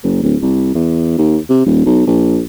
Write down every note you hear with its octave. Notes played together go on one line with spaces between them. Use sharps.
F#1
D1
C2
E2
D#2
C3
D#1
B1
A#1